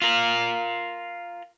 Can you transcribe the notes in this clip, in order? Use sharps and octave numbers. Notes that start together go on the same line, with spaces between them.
F4 A#4